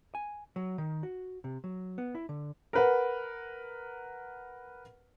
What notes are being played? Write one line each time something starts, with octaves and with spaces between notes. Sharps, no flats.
G#5
F#3
D#3
F#4
C3
F#3
B3
E4
D3
A#4 B4 F#5